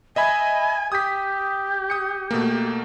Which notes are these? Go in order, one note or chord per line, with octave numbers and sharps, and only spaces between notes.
D#5 E5 G#5 B5
G4 D#6 B6
D#6 C#7
B2 A3 A#3